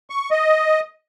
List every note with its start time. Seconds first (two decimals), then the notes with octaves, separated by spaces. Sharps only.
0.10 C#6
0.31 D#5